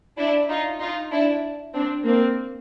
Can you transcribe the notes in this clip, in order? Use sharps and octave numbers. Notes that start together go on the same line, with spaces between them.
D4 E4
D#4 F4
D#4 F4
D4 E4
C4 D4
A#3 C4